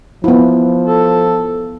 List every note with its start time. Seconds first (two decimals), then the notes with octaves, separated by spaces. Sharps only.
0.24 F3 B3 E4
0.87 A4